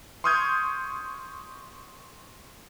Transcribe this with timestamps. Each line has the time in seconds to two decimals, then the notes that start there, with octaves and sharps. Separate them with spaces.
0.24 C6 C#6 D#6 F6 G6 G#6